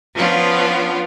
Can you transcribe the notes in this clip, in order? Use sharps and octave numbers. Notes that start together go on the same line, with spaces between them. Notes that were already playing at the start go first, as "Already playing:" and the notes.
F3 B3 C#4 D4 F4